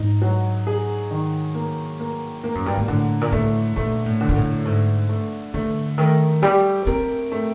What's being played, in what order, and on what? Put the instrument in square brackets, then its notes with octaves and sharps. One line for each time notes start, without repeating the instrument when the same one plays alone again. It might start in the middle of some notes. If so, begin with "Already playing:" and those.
Already playing: [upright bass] G#2 [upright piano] D#4
[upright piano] F#3
G#4
D#3
A#3
A#3
A#3
[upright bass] F#2
G2
G#2
[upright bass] A2 [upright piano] D3
[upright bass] A#2
[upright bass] A2 [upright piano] A3
[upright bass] A#2 [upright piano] A3
[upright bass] A2
[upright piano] D3
[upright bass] A#2
A2
[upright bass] G#2 [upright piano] A3
[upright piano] A3
[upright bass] D3 [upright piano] A3
[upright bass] D#3 [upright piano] A3
[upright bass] G3 [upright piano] G4
[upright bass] C4 [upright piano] A#4
[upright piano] A3